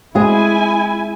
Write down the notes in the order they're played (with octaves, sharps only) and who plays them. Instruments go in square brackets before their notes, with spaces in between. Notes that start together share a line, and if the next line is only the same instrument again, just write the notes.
[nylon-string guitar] G#3 C4 G#4 [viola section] E4 G#5